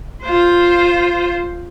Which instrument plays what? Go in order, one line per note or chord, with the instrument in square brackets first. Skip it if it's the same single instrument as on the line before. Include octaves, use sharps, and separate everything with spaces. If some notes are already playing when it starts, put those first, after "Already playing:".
[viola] F4 C5